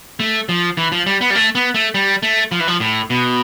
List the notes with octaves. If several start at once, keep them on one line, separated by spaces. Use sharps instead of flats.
A3
F3
E3
F3
G3
B3
G3
A3
B3
A3
G3
A3
F3
E3
F3
A2
B2